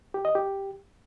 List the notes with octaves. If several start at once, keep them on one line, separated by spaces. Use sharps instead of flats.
G4
D#5
G4